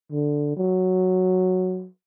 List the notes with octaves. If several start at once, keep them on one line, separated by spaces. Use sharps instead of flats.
D3
F#3